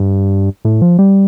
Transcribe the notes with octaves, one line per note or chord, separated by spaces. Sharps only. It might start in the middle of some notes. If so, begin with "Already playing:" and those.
Already playing: G2
A2
F3
G3